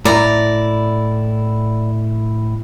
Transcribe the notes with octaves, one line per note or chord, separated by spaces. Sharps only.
A2 E4 D5 A#5